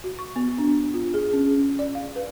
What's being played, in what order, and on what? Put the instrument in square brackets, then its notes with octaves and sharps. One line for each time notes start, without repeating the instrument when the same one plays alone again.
[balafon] F#4
C#6
B3
D4
F4
G#4
C#4
D5
F5
B4